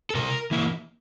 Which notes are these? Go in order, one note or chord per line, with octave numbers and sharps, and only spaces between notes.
A4
C3 A#4
E3 A#3 E4